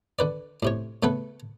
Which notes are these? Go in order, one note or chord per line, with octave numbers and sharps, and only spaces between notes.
D3 B4 D5
A2 C3 C#5
C#3 A3 B3 A4 B4